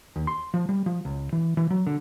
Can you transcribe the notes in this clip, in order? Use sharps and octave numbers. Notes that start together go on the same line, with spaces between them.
D#2
C6
F3
G3
F3
C#2
E3
E3
F#3
D3